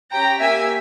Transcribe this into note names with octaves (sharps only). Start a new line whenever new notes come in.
C#4 G4 G5 A#5
A#3 C#4 G4 E5 G#5